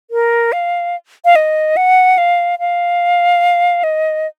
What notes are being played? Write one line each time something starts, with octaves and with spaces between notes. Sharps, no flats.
A#4
F5
F5
D#5
F#5
F5
F5
D#5